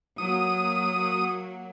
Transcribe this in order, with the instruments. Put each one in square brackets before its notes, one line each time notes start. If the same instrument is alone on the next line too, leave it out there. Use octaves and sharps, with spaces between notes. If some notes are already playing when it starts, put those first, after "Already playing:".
[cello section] F#3 A#3 [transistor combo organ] D#6